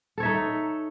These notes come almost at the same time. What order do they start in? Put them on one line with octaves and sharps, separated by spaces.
A4 C#5 E5 D#4